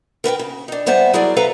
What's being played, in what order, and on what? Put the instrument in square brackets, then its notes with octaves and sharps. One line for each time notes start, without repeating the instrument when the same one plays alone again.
[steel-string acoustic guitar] A#4 B4 F#5 G5
C#3
D4 D#4
G3 B3 C5 E5 F#5 A5
F#3 E4 G#4 A#4 D5
A4 B4 E5 F5 A#5